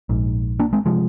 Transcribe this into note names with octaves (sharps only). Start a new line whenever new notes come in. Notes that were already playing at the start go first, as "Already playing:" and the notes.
A#1 G#2
A#3 D4
G#3 C4
C3 F3 G#3